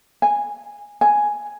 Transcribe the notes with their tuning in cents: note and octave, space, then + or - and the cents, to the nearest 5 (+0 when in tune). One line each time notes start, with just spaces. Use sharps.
G#5 -10
G#5 +0